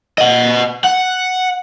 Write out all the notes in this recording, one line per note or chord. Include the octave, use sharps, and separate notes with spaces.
D#5 F#5
F#5